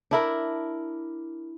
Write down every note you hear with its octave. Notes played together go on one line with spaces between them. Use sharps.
D4 E4 A#4